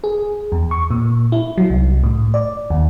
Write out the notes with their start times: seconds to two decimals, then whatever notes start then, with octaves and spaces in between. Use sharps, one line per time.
0.04 G#4
0.52 E2
0.71 C#6
0.91 A#2
1.32 E4
1.58 F#3
1.70 C2
2.03 A2
2.34 D5
2.70 D#2